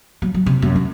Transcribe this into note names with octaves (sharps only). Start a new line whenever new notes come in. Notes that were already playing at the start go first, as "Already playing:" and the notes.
F#3
F#3
C3
F#2
C#4